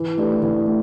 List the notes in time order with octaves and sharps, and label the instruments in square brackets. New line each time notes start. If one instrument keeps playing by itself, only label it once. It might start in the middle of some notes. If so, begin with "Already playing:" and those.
Already playing: [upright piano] E3
A3 D4 G4 B4
E3
A3